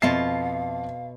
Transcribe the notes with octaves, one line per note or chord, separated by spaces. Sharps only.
F2 B2 F4 E5 F5 A5 C7